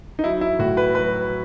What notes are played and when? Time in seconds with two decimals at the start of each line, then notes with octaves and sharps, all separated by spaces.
0.19 D#4
0.24 F#3 E4
0.41 E4
0.59 A2 F#4
0.77 B4
0.95 F#3 B4